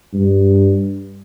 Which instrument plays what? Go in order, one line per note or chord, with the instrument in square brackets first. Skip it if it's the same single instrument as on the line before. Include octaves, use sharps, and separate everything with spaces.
[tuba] G2